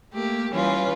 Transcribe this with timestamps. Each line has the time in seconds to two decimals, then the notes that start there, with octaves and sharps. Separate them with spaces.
0.13 A3 A#3 G4
0.52 E3 G3 C#4 F4 B4